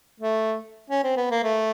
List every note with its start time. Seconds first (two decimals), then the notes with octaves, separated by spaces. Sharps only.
0.20 A3
0.90 C#4
1.04 C4
1.17 B3
1.31 A#3
1.43 A3